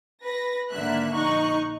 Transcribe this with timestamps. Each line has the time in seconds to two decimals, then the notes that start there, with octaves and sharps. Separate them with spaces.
0.22 B4 A#6
0.70 G#1 D3 A#3 E5 F#6
1.14 A#1 D#4 C#6 F#6